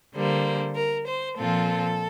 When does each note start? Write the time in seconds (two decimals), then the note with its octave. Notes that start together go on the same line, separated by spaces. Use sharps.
0.13 D3 G3 A#3 C5
0.75 A#4
1.06 C5
1.37 A#2 F3 C4 F4 A4